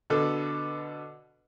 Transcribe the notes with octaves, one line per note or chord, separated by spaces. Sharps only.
B2 D3 A4 B4